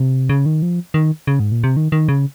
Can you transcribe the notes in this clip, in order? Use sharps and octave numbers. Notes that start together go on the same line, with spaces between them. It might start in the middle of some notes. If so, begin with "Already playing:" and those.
Already playing: C3
C#3
D#3
F3
D#3
C#3
G#2
A#2
C3
D#3
D#3
C#3